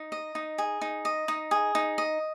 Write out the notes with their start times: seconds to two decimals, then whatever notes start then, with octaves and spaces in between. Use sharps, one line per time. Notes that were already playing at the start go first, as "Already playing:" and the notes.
Already playing: D#4
0.12 D#5
0.35 D#4
0.58 G#4
0.81 D#4
1.05 D#5
1.28 D#4
1.51 G#4
1.75 D#4
1.98 D#5